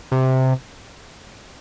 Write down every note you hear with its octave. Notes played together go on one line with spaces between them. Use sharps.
C3